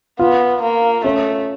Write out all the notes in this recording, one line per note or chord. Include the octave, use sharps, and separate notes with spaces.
B3 F4
A#3
A3 C#4